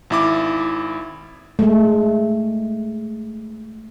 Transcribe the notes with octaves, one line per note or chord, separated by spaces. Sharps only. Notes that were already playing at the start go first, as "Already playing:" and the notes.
G#1 E4 D6
G#3 A3